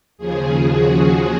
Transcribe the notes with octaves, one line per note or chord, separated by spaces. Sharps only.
D#2 C#3 F3 G#4
F#4